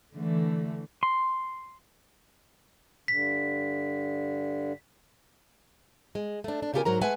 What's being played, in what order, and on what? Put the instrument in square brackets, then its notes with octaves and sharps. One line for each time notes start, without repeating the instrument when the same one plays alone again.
[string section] D3 E3 A3
[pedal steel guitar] C6
[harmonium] G2 D3 [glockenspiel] B6
[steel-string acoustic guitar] G#3
A3 D4
D4
C#3 F4 G4 A4 A#4 G#5
G#2 F#3 A#4 A#5
G#3 A3 B4 E5 F#5 G#5